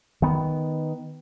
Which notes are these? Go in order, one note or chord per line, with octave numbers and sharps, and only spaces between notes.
D#3 B3